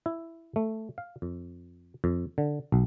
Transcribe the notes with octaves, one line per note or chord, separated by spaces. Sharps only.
E4
A3
F5
F2
F2
D3
B1